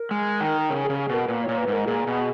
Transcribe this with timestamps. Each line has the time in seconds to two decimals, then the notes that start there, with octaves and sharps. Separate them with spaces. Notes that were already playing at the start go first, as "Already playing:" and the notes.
Already playing: A#4
0.11 G#3
0.41 D#3
0.70 C#3 A#4
0.85 C#3 G#4
0.99 G#4
1.09 B2 A#4
1.28 A#2 B4
1.44 A#2 C#5
1.58 B4
1.68 G#2 A#4
1.87 A#2 G#4
2.07 B2